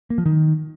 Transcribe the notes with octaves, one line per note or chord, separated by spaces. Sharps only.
A#3
F3
D#3